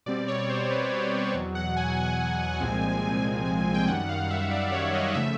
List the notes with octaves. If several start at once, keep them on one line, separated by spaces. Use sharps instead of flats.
B2 G3 C4 D5
C#5
C5
B4
C5
E2 B2 F#3
F#5
G#5
C2 A#2 F3 G#3 C4
G#5
G#5
G#5
G5
F#2 D#3 G3 F#5
F5
E5
D5
C#5
D#5
C#3 F3 A3 E5